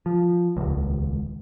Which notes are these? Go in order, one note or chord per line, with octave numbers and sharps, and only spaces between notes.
F3
D#1 C#2